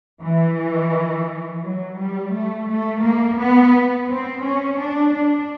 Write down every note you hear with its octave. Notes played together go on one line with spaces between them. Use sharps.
E3
F#3
G3
A3
A3
A#3
B3
C4
C#4
D4
D4